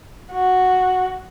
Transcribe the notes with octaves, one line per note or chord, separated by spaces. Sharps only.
F#4